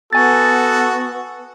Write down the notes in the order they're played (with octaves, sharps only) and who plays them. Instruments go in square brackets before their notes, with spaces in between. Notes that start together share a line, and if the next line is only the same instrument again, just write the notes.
[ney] B3 [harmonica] F#4 [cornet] A4 [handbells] G#5 A6